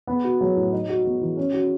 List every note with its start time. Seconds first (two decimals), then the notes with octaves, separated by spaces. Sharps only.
0.07 B3
0.24 F#4
0.41 F#3
0.56 A2
0.72 D#4
0.89 F#4
1.05 B3
1.21 E3
1.37 C#4
1.53 F#4